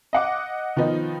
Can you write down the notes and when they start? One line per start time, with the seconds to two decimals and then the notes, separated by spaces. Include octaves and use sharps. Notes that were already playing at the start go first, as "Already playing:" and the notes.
0.13 D#5 F#5 D6
0.76 D#3 F3 B3 D#4